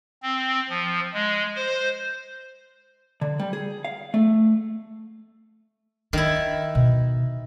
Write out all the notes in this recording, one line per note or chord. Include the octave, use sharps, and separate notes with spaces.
C4
F3
G#3
C5
D3
G3
G#4
F5
A3
D#3 D4 E4
B2